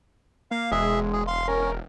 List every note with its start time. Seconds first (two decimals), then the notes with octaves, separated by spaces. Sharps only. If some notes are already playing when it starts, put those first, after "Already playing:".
0.51 A#3 F5
0.71 E1 G#3 G#4 E5
1.13 G#4
1.27 F5 C6
1.48 C#4 A#4